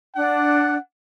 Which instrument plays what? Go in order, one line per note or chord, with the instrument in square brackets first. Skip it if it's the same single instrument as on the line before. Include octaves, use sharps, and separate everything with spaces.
[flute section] D4 [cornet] F#5